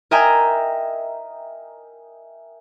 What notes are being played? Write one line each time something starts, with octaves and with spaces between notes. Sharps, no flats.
A#4 D#5 E5 G5 G#5 A#5